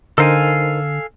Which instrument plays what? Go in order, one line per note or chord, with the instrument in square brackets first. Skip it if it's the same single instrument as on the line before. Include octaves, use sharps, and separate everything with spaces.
[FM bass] D3 [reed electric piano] D#4 A#4 C5 [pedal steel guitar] A4 F5 G#5